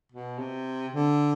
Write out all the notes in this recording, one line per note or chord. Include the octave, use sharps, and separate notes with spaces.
B2
C3
D3